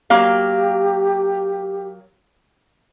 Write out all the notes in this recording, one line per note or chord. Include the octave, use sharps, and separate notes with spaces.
F#3 A#3 G4 F5